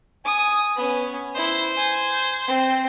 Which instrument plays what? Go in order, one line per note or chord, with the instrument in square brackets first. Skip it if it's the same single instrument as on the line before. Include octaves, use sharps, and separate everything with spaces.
[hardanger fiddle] G#5 D#6
B3 C#4
[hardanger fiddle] E4 [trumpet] C5
[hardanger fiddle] G#5
C4